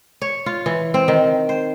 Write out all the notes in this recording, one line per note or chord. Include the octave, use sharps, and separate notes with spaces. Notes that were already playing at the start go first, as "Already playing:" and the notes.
C#5
F4
E3
C4
D#3
C5